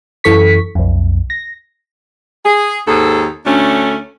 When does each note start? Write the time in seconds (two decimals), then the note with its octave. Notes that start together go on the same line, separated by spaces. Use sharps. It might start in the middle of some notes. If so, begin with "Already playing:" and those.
0.24 F#2 E3 A4 C#6 B6
0.75 B1 F2
1.30 A#6
2.45 G#4
2.88 D#2 G#2 G#4 A4
3.46 D2 A3 C#4 D4